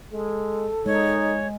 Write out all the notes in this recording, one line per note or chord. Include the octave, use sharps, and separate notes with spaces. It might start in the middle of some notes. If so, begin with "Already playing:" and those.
G#3 A4
G#3 D#4 C#5